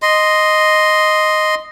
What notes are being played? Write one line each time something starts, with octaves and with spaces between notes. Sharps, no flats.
D#5 C6